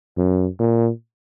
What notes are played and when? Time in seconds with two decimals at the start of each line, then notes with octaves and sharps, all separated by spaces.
0.17 F#2
0.59 A#2